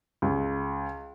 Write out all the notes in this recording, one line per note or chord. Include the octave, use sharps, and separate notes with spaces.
C#2